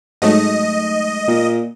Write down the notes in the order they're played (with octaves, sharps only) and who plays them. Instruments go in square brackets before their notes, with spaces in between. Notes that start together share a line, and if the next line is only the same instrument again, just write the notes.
[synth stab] G#2 F#3 A3 [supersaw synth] D#5
[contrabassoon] A#2